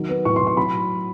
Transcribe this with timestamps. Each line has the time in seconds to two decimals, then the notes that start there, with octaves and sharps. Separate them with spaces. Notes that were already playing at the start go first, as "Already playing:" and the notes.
Already playing: D#3 F#3
0.09 B3
0.25 A2 C#6
0.36 C6
0.40 A2
0.47 C6
0.57 F#3 B5